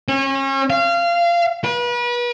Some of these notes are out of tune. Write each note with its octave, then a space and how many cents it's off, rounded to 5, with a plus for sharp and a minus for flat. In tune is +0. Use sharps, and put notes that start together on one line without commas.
C#4 -35
F5 -25
B4 -35